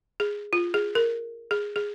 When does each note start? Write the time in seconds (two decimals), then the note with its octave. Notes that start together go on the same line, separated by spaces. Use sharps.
0.20 G#4
0.53 F4
0.74 G#4
0.95 A#4
1.51 G#4
1.76 G#4